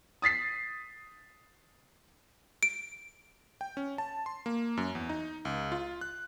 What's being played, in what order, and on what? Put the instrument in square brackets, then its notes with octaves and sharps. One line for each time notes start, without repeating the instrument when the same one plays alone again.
[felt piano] D#6 A6 B6 C7
[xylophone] D7
[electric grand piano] G5
C#4
A5
C6
A#3
F#2
E2
D#4
C#2
F4
F#6